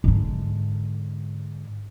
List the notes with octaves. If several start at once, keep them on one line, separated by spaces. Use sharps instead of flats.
G#2 D3